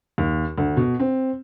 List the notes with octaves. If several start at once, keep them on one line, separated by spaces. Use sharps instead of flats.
D#2
D2
B2
C4